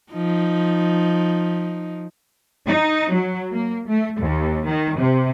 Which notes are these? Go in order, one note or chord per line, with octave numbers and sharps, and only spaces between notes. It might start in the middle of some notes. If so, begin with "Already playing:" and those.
F3 D#4
D#4
F#3
A#3
A3
D#2
D#3
C3